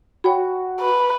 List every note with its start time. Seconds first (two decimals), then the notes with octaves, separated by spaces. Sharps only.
0.24 F#4 C#5 G5 B5
0.80 B4